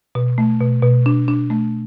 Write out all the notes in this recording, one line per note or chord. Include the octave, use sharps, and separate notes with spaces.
B2
A3
B2
B2
D4
D4
A3